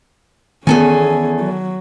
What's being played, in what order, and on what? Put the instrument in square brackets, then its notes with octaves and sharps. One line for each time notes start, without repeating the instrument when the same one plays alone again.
[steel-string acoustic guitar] E2 A4 G#5 [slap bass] D#3 B3 [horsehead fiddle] C#4 G#4
[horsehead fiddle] F#3